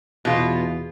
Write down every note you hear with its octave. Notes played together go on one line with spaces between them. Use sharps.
E2 B2 F4